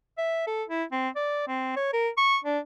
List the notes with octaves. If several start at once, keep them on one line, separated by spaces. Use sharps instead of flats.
E5
A4
E4
C4
D5
C4
C#5
A#4
C#6
D4